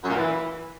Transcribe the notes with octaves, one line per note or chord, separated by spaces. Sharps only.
F#2
A#2
E3